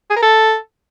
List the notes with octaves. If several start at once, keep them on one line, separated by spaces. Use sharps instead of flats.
G#4
A#4
A4